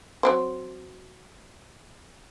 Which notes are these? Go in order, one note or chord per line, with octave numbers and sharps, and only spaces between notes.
F#3 C4 C5